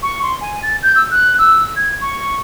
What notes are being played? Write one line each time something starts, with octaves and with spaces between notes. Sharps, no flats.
C#6
C6
G#5
A6
G6
E6
F#6
E6
G#6
C#6